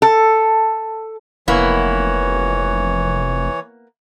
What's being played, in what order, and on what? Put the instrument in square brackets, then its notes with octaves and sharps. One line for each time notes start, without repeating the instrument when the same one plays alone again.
[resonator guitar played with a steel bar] A4
[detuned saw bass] F1 [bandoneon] E3 C#5 [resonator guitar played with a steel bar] A#3 B3 E4